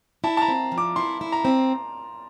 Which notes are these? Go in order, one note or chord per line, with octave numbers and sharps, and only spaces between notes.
E4 A5
A5
A#5
C4
F3
D6
E4 C6
E4
A#5
C4